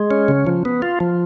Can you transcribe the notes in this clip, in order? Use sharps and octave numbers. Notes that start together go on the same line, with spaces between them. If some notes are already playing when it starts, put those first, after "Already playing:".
Already playing: G#3
C#4
C#3
F3
B3
F4
F3